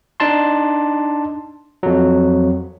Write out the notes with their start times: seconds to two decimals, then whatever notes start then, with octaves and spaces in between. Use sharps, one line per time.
0.20 D4 D#4 A5 C6
1.83 F2 F#3